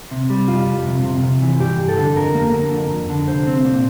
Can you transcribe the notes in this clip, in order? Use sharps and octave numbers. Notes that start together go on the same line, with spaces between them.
C3
G3
F2 F4
F2
C3
C3
C3
E3
G2 G4
G2
A4
D3
F2 A#4
A#3
D3
F2
F2
D3
C2 C5
C4
A#2